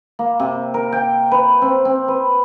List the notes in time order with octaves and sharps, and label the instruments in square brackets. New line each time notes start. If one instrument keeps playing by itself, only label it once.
[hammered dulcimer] A#3
C3
A#4
G5
B4
C4
C4
B4